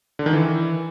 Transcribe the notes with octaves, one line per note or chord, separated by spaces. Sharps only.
D3
D#3
E3